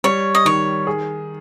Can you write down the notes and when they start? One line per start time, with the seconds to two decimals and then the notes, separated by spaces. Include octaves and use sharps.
0.04 G3 C#5
0.35 D#5
0.45 D#3 C#5
0.87 G#4